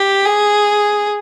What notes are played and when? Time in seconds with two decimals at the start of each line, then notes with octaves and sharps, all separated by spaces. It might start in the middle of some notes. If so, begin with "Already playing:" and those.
Already playing: G4
0.25 G#4